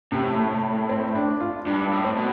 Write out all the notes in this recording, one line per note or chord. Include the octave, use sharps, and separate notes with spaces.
A2 C3
A3
C4
D4
F4
G2 D4
A2
C4
B2